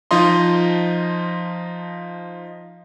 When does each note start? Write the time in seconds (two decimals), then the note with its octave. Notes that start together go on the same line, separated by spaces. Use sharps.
0.11 F3 D#4 F4 D#5 C6